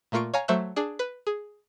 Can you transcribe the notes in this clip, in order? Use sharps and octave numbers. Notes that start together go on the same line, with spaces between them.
A#2 A3 A#3 F4 C#6 D7
C#5 F5 G#5 A#5
F#3 A3 C5 E5 E6 F#6
D4 G#4
B4
G#4